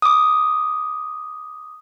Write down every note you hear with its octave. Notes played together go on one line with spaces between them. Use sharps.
D6 D#6